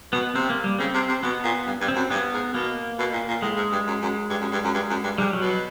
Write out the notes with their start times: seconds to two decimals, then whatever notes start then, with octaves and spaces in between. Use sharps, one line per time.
0.12 B2 B3
0.35 C3 C4
0.50 A#3
0.64 G3
0.78 C#3 C4
0.94 C3
1.08 C3
1.23 B2 B3
1.44 A#2
1.67 G2
1.81 G2
1.88 C4
1.96 F#2
2.10 G2 B3
2.33 G#2
2.54 B2 A#3
2.99 B2
3.13 A#2
3.29 A#2
3.42 A2 G#3
3.57 G#2
3.72 G2
3.87 F#2
4.02 F#2
4.30 G2
4.41 F#2
4.52 G2
4.64 F#2
4.74 G2
4.90 F#2
5.03 G2
5.18 G#2 G3
5.33 F#3
5.41 B2